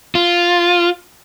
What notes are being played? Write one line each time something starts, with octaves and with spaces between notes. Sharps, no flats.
F4